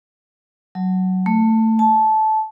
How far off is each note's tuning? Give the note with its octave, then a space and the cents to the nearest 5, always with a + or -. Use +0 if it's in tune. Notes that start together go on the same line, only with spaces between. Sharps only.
F#3 +10
A3 +15
A5 -15